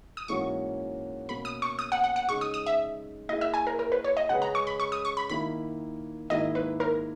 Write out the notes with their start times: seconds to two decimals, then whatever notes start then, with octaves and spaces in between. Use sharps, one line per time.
0.17 D#6
0.28 G#2 E3 A#3 C#4 F#4 C#6
1.28 B2 A#3 C#4 B5
1.45 D#6
1.62 C#6
1.79 D#6
1.92 F#5
2.04 F#5
2.16 F#5
2.28 C#3 G#3 D#4 C#6
2.41 D#6
2.54 D#6
2.66 E5
3.29 A#3 E4 G#4 D#5
3.41 E5
3.54 G#5
3.67 A#4
3.79 A#4
3.92 B4
4.04 C#5
4.17 D#5
4.29 C#3 G#3 C#4 G#4 B4 F#5
4.42 A#5
4.55 C#6
4.67 B5
4.80 C#6
4.92 D#6
5.05 C#6
5.17 B5
5.29 D#3 A#3 E4 B5
6.30 G#2 D#3 A#3 E4 D#5
6.55 B4
6.80 A#4